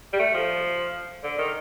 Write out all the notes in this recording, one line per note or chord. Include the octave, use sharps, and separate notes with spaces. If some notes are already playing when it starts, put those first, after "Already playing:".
G3
A3
F3
D3
D#3